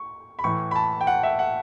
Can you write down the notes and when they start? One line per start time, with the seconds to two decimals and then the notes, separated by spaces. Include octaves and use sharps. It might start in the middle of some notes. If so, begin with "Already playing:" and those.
Already playing: C#6
0.39 B5
0.44 A2 E3 C#6
0.71 B5
0.76 A5
1.01 G5
1.07 F#5
1.23 E5
1.39 F#5